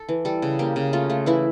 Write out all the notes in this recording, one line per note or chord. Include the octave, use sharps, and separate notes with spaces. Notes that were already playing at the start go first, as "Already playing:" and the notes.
Already playing: A4
E3
G3 A4
C#3
A#3 G4
C#3
A3 F4
A3
E3 E4